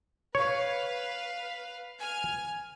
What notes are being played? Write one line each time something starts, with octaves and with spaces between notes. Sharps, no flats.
B4 C#5 F5
G#5 F6